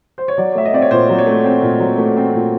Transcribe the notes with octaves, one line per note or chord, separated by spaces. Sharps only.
C5
C#5
F#3 D5
A3 E5
D#5
C4 D5
C#5
A#2 C5
F#3
C#5
A3
C4
A#2
F#3
A3
C4
A#2